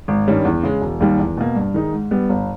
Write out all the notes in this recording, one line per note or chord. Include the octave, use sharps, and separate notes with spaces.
G#1
G2 D#3 G3 C#4
E2
C#3 G#3
E1
D#2 D#3 G3
E2
B2 A#3
G2
D#3 G#3 D#4
G#2
G3 B3
G1